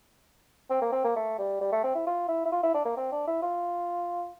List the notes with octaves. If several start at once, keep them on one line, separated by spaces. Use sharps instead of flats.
C4
A#3
C4
A#3
A3
G3
G3
A3
C4
E4
F4
E4
E4
F4
E4
D4
A#3
C4
D4
E4
F4